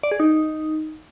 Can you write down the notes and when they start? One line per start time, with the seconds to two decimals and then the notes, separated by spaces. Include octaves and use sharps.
0.03 D5
0.12 G#4
0.20 D#4